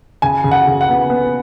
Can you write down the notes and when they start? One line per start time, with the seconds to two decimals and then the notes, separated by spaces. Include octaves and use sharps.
0.22 C#3 G#5
0.44 C#3
0.51 F#5
0.67 C#3
0.81 F#5
0.89 B3
1.10 B3